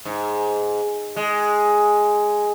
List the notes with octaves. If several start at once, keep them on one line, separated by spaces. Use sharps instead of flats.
G#2
G#3